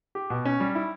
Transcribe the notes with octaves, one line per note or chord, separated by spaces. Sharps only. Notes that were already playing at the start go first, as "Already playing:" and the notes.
G4
B2
C#4
G3
E4